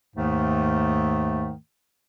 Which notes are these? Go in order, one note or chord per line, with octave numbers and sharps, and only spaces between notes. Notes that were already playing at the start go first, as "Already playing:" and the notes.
D#2 G#2 D#3 A3